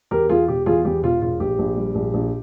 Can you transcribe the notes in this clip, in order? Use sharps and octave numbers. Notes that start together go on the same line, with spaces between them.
E2 G4 A#4
E2 F4 G#4
E1 G4
E2 F4 G#4
E2 G4
E1 F4
E1 F4
A#1 G4
A#1
G3
A#1
A#1